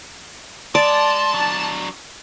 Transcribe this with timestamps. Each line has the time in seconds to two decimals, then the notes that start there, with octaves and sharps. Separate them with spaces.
0.75 G#3 D5 A5
1.34 F#3 D4